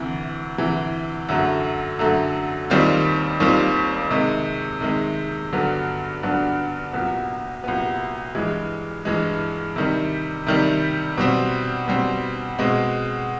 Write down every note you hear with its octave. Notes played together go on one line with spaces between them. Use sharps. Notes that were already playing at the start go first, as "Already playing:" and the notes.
Already playing: D2 C3 E3
D2 C3 E3
F#2 D3 F#3 A3
F#2 D3 F#3 A3
D#2 D#3 G3 C4 F4
D#2 D#3 G3 C4 F4
C3 D#3 G#3
C3 D#3 G#3
G2 D3 F#3 B3 D4
G2 D3 F#3 B3 D4
C2 A#2 F#3 B3
C2 A#2 F#3 B3
G2 E3 G#3
G2 E3 G#3
C3 D#3 G3
C3 D#3 G3
B2 G3 C4
B2 G3 C4
B2 G#3 C4